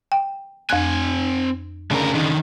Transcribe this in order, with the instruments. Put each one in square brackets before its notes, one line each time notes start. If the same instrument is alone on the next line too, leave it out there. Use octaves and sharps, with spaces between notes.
[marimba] G5
[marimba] F2 F#6 [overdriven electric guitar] C4 G#5
[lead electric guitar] D2 A#4 [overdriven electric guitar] C#3 D4
[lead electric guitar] D3 D#3